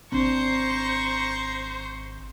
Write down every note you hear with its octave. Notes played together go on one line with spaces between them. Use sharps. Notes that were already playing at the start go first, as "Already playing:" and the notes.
G#1 C4 D4 C5 A#5 C#6